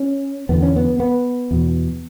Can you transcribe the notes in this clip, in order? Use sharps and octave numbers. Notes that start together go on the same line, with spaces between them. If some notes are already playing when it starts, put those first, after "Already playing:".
Already playing: C#4
E2 D3 B3
C#4
B3
B3
E2 B2